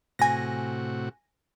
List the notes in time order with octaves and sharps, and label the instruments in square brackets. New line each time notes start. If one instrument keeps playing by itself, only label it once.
[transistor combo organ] A2 C3 F#4 [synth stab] G#5 A#6